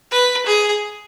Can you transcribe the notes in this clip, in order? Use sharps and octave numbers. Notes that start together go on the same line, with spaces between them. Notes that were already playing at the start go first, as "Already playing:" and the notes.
B4
G#4